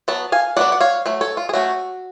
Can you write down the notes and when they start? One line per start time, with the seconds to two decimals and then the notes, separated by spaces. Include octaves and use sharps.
0.08 F#3 B3 A5
0.32 F5 G#5
0.56 F#3 B3 D4 D5 F#5
0.72 F#5
0.80 C#5 F5
1.06 F#3 A3
1.21 A4 C#5
1.37 F4
1.49 G#4
1.53 F#3 A3 C#4 F#4